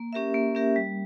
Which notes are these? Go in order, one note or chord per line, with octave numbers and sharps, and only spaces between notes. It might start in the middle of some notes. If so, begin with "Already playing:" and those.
Already playing: A#3
C#4 G4 A#4 E5
A#3
C#4 G4 A#4 E5
G3